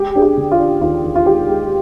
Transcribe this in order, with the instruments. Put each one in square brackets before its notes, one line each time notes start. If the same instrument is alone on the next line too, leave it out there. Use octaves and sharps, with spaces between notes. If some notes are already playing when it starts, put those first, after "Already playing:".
Already playing: [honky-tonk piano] G#3 G4
D4 G#4
G4
D3
F4
D4
D#2 F4
D#2
F4
G#3 G4
G#3